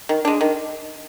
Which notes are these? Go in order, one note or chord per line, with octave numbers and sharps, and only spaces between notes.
D#3
G#3 D4
D#3